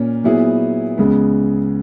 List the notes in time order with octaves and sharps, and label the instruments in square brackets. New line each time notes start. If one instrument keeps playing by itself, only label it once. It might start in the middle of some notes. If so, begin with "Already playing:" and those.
Already playing: [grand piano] A#2 A#3 C#4
A#2 F#3 B3 E4 G#4
C#2 C#3 G#3 B3